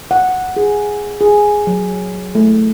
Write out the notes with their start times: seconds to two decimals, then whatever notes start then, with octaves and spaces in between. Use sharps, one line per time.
0.11 F#5
0.57 G#4
1.21 G#4
1.67 F#3
2.35 A3